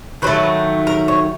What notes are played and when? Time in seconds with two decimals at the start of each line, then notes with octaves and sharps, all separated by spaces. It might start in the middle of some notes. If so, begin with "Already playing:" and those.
0.22 D#3 F#3 A3 B4
0.87 A#4
1.08 C#5